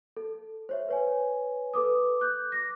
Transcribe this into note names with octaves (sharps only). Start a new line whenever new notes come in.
A4
C5 C#5 E5
B4 C#5 G#5
A4 B4 D6 D#6
D6 F#6 G6
D6 A#6